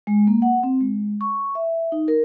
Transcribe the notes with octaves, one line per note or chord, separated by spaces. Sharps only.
G#3
A#3
F#5
C4
G#3
C#6
E5
D#4
A#4